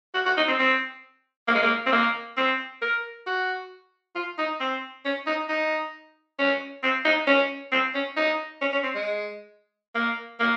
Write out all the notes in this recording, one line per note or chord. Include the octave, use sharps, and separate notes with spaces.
F#4
F#4
D#4
C4
C4
A#3
G#3
A#3
C4
A#3
C4
A#4
F#4
F4
D#4
C4
C#4
D#4
D#4
C#4
C4
D#4
C#4
C4
C#4
D#4
C#4
C#4
C4
G#3
A#3
A#3